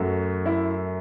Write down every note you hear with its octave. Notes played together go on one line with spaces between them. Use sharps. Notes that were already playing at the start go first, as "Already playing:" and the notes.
Already playing: F#2 F#3 A3
E4